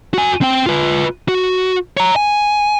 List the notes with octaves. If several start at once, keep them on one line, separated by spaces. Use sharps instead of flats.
F#4 G#5
C4 G5
F4 B4
F#4
C#5 A#5
G#5